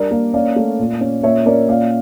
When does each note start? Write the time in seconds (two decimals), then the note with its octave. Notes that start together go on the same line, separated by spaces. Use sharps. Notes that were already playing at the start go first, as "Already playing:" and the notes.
Already playing: G3 D4 A#4 D5
0.11 A#3
0.34 C#4 D5 F5
0.56 A3
0.79 A#2
1.01 C#4
1.23 A#2 C#5 E5
1.46 C#4 A#4 D5
1.69 A#2 D5 F5